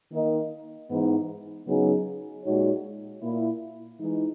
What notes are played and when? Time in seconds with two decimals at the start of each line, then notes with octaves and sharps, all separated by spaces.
0.12 D#3 A#3 D#4 A#4 D#5
0.90 G#2 E3 B3 D#4
1.67 C#3 F#3 B3 D#4 G#4
2.45 A#2 G#3 D#4 F#4 C#5
3.22 A#2 A#3 E4
4.01 E3 G#3 D#4